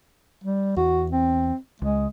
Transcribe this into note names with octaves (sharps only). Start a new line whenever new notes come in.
G3
E2 F#4
C4
C#2 G#3